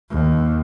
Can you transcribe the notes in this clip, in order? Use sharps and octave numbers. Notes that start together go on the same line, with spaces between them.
D#2